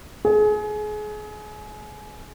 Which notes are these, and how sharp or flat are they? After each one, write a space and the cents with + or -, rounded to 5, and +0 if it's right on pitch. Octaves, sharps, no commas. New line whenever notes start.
G#4 +30